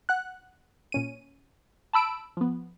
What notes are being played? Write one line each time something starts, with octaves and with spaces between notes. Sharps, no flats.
F#5 F#6
A#2 C#4 D#7
A5 B5 E6 D7
F3 B3